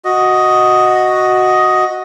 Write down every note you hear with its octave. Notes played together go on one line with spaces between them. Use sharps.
F#4 D#5